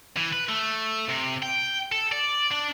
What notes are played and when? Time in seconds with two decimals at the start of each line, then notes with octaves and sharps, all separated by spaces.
0.17 E3
0.33 B4
0.49 A3
1.09 C3
1.43 G5
1.92 A4
2.12 D5
2.52 D4